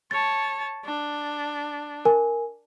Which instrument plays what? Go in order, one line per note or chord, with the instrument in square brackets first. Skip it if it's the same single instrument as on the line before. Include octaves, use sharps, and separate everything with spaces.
[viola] C#5 A5 [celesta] A6
[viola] D4
[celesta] A#4 G#5